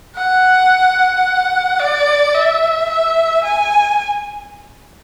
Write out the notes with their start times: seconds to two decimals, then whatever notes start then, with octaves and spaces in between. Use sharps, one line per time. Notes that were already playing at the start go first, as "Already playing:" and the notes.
0.16 F#5
1.80 D5
2.35 E5
2.90 E5
3.44 G#5